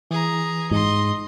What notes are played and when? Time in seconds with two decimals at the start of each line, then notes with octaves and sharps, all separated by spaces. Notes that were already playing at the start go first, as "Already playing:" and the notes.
0.11 E3 G#4 A#5
0.71 G#2 D#5 C6